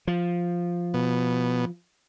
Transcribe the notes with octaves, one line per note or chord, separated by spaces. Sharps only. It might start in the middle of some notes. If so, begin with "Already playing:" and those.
F3
B2